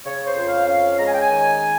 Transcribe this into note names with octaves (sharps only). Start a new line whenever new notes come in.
C#3 C#5
C5
F2
F5
C#4 F5
G#3 A#5
G#5
G5
G#5
D#3